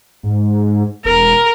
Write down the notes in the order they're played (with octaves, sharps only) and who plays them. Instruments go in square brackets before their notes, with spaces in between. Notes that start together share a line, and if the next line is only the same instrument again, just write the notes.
[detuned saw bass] G#2
[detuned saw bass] E1 [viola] A#4